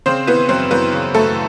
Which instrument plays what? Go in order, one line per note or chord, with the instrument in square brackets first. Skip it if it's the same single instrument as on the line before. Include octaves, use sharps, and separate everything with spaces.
[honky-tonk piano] C#3 C4 C5
E3 B3 B4
F#2 C4 C5
F#2 B3 B4
C#3
F#2 A3 A4